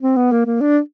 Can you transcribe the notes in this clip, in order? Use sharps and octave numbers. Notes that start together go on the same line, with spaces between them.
C4
B3
A#3
A#3
D4